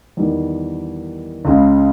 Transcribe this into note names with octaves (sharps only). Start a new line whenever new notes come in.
E2 D#3 G3
C#2 C#3 G#3